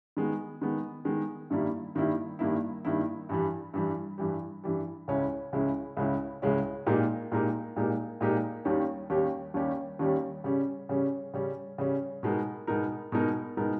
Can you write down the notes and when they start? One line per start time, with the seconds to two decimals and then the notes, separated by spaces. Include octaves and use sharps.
0.17 D#3 G#3 B3
0.61 D#3 G#3 B3
1.05 D#3 G#3 B3
1.50 G2 D#3 G3 A#3 E4
1.95 G2 D#3 G3 A#3 E4
2.39 G2 D#3 G3 A#3 E4
2.85 G2 D#3 G3 A#3 E4
3.29 G2 E3 G3
3.74 G2 E3 G3
4.18 G2 E3 G3
4.64 G2 E3 G3
5.08 C#2 C#3 G#3 C#4 E4
5.53 C#2 C#3 G#3 C#4 E4
5.97 C#2 C#3 G#3 C#4 E4
6.42 C#2 C#3 G#3 C#4 E4
6.87 A#2 G#3 D#4 G4 A#4
7.32 A#2 G#3 D#4 G4 A#4
7.76 A#2 G#3 D#4 G4 A#4
8.21 A#2 G#3 D#4 G4 A#4
8.65 D#2 D#3 G3 C#4 G4
9.10 D#2 D#3 G3 C#4 G4
9.54 D#2 D#3 G3 C#4 G4
9.99 D#2 D#3 G3 C#4 G4
10.44 C#3 G3 C#4
10.89 C#3 G3 C#4
11.34 C#3 G3 C#4
11.78 C#3 G3 C#4
12.23 B2 G#3 B3 D#4 A#4
12.67 B2 G#3 B3 D#4 A#4
13.12 B2 G#3 B3 D#4 A#4
13.57 B2 G#3 B3 D#4 A#4